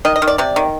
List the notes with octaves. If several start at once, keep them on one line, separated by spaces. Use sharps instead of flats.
D#3 D#5
D#5
D#3
D5
C3 D5
D#3